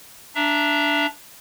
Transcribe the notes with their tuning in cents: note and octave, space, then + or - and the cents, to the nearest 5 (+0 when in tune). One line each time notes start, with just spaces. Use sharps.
D4 -5 E5 +15 A#5 +0